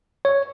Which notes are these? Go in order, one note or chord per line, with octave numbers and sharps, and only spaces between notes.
C#5